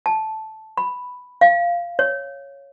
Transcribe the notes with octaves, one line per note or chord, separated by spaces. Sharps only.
A5
B5
F5
C#5